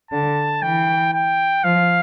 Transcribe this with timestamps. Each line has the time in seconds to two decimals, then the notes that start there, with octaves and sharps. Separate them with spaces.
0.11 D3 A5
0.62 E3 G5
1.13 G5
1.64 F3 F5